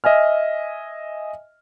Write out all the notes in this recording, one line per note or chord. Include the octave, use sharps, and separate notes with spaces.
D#5 E5 G#5 F6